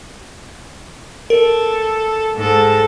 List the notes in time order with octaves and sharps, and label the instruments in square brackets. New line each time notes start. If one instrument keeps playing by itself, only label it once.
[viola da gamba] A4 [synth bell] A#4
[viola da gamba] G#2 A4